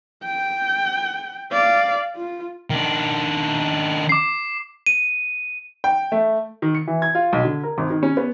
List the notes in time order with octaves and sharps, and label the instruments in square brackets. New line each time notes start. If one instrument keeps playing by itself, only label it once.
[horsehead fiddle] G5
D5 F5
F4
[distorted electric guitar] D#3 D4
[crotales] D6 C7
[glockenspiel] D#7
[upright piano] G5
A3
D#3
C#7
E3
G#6
F4
B1
D3
A#4
G#1
D#3
C#4
B3